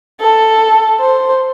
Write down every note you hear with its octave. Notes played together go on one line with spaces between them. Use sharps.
A4
C5